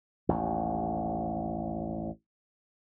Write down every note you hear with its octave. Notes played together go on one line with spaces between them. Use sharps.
A1 D#2